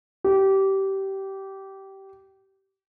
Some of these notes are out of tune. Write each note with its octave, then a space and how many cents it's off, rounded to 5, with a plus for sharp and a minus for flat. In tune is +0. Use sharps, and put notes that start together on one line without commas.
G4 -20